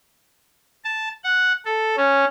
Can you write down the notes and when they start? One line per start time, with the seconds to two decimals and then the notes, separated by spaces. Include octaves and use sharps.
0.84 A5
1.24 F#5
1.65 A4
1.97 C#4